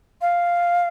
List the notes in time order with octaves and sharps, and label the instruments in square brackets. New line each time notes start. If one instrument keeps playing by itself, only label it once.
[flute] F5